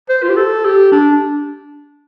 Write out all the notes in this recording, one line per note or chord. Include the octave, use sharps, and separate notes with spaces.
C5
F4
G4
A4
G4
D4